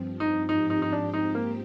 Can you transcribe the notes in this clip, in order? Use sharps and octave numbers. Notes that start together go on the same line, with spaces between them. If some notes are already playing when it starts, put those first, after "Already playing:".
Already playing: G2 F3 C4
D#4
G#2 F3 C4 D#4 G4
D#4
D#4
D4
D#4
A#3